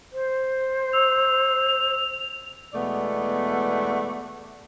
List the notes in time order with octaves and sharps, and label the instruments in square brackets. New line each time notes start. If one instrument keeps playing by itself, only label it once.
[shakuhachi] C5
[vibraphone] E6 [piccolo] F7
[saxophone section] E2 B2 G#3 A3 B3 D5